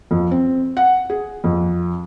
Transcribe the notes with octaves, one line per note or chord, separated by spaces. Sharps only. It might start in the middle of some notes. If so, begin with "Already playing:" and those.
F2
C4
F#5
G#4
F2